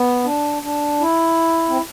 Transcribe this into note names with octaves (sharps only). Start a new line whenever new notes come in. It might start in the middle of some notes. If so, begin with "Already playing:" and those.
Already playing: B3
D4
D4
E4
C4